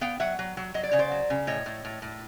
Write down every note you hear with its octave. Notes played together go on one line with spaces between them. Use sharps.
B3 F5 G5
F#3 E5 F#5
F#3
F#3
F#3 D#5
D5
C#3 C#5
C5 D5
F#3
C#3
A2 C#5 D#5
A2
A2
A2